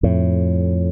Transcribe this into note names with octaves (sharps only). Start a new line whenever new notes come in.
F2 A2